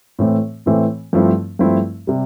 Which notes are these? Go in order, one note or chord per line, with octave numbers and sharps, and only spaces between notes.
A2 E3 A3 C4
A2 E3 A3 C4
G2 F3 A3 C4 E4
G2 F3 A3 C4 E4
C3 G3